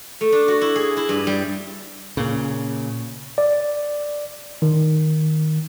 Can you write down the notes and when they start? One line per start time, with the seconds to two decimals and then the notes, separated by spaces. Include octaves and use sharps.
0.21 A3
0.32 D4
0.48 F#4
0.61 E4
0.76 G#4
0.97 E4
1.09 G2
1.27 G3
2.17 A#2 C#3
3.38 D5
4.62 D#3